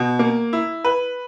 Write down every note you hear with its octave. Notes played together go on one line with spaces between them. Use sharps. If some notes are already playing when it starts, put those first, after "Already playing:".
Already playing: B2
A#3
E4
B4